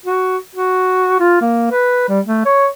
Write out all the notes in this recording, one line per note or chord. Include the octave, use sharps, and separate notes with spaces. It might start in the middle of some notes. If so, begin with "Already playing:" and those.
F#4
F#4
F4
A#3
B4
G3
A3
C#5